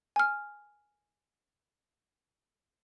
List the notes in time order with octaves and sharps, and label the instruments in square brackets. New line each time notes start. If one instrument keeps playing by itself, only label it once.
[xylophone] G#5 F6